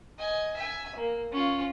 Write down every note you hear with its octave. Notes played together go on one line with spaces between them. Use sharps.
D#5 G#5
E5 G#5
A#3
C#4 F4